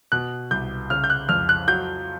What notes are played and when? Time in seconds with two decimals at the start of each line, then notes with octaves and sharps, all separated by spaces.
0.12 B2 F#6
0.51 C2 G6
0.90 C#3 F6
1.04 G6
1.10 F#6
1.29 F2 F6
1.49 F#6
1.68 F#3 G6